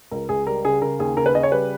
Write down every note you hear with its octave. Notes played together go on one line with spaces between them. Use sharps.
C#2 A#4
C#2 G#4
G3 A#4
C#3 G#4
C#3 A#4
D#2 G#4
C#3 A#4
B4
C#3 D#5
C#5
G3 B4